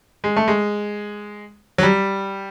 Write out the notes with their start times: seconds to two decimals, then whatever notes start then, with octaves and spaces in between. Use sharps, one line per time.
0.24 G#3
0.36 A3
0.48 G#3
1.78 F#3
1.83 G3